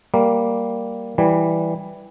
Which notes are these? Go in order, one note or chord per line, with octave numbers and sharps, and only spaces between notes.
G3 A#3
E3 G3